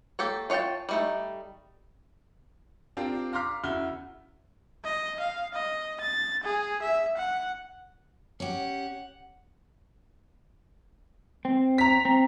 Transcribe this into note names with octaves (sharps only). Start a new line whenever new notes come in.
A#3 G4 A4 C#5
F4 C#5 D5 G5 A5
G3 A3 D#4
C4 D4 F4 G4 A#4
F5 A#5 C6 D6 F6 B6
E2 C#3 E4 F#4 F6 G7
D#5
F5
D#5
A6
G#4
E5
F#5
C#4 G4 F#5
C4
A#5 B6
C4